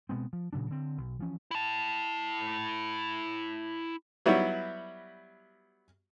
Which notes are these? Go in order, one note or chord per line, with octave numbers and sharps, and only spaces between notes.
B2 G#3 B3 C4
F3
A#2 C#3 F#3 D4
D3 C4
B1
E3 F3 C#4
E4 A5
F#3 G3 B3 E4 F#4